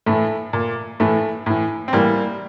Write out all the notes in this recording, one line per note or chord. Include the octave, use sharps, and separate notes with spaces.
A2 E3 A3
A#2
A2 E3 A3
A2 E3
C4
A2 E3 G3 A#3